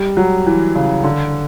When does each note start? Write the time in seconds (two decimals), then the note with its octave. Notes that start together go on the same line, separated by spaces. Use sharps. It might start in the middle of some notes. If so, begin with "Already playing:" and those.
Already playing: G3
0.17 F#3
0.46 E3
0.75 C#3
1.04 D3